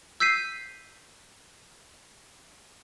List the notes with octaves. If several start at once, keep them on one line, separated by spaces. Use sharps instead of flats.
E6 G6 B6 C7 D#7